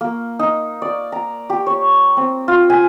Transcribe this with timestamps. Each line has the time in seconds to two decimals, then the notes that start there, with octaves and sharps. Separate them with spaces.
0.01 A#3
0.39 D#4
0.82 D5
1.12 A#5
1.50 G4
1.66 C#5
2.17 C4
2.48 F4
2.70 G#5